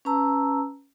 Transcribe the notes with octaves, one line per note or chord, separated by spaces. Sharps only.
C#4 B4 A5 A#5 E6